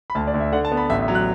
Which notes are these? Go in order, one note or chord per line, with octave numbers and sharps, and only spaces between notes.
B5
D2 A5
D5
D2
E5
D3 F#5
A5
B3
B5
A1 E5
E5
F#3
F#6